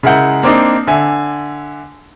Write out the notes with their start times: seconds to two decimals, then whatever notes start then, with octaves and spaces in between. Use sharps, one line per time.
0.03 C#3 G#3 E4 A#4 F#5 G6
0.43 A#3 C4 D4 D#4
0.87 D3 E5 G#5